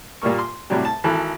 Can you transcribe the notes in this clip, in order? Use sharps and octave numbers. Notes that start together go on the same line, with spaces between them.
A#2 G3 A#3 C#6
C6
A2 C3 F#3 G3
A5
G#1 E3 A4